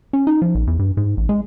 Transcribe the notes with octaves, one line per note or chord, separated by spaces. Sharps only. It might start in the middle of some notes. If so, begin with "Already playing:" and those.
C#4
D#4
F3
A#1
E2
G2
G#2
A1
G#3